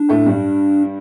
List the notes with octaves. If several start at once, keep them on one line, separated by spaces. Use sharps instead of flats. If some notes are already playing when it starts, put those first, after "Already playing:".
Already playing: D4
A2 A3
G2 G3